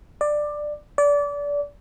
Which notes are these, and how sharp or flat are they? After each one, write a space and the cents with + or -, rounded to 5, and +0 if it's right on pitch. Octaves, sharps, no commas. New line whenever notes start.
D5 +15
D5 -25